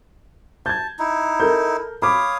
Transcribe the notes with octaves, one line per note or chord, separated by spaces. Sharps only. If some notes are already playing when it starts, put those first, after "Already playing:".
A5 G6 G#6
D#4 E4
A4 A#4 G6
C#5 F5 B5 D6 D#6